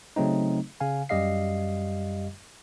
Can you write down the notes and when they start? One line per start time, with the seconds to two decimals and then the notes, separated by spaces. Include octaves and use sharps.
0.16 C#3 F#3 A3 C4 D#4
0.80 C#3 F5 G#5
1.09 F#2 G3 G4 D#5 F5 C7